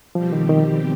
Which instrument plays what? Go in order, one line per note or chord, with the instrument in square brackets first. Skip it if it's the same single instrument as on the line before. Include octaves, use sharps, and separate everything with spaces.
[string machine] B2 G3 C4 G4 [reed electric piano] F3
[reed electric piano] D#3
D#3